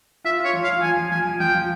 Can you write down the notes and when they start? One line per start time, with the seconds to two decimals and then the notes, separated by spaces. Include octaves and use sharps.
0.24 F4 E5
0.40 F4 C#5
0.53 F3
0.64 F5
0.68 F4
0.82 F3 G#5
0.97 F3
1.11 F3 G#5
1.25 F3
1.40 F3 G5
1.54 F3